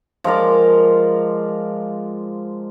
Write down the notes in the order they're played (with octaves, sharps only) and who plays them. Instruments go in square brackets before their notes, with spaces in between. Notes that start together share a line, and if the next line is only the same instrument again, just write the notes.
[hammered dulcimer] F3 G#3 A#4 D5